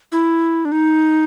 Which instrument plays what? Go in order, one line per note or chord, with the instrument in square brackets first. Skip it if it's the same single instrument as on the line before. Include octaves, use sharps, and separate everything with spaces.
[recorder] E4
D4
D#4